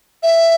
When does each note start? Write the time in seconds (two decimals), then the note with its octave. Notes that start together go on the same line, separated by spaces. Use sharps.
0.23 E5